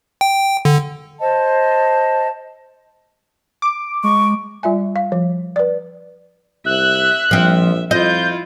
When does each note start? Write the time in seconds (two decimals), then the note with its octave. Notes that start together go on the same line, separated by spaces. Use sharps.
0.21 G5
0.65 D3
1.19 C5 D#5 A5
3.62 D6 D7
4.04 G#3 C#6
4.63 G3 F4 E5 G#5
4.96 F5
5.12 F3
5.56 B4 D5
6.66 C2 E5 F#6
7.31 A#1 F3 C4 E5
7.91 F2 E4 F4 D#5 G6